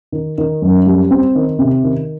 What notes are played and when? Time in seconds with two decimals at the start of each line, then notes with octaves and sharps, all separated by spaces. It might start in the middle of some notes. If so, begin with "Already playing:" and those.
0.12 D#3
0.38 D#3
0.62 F#2
0.87 G3
1.11 C4
1.35 D#3
1.59 C3
1.84 D#3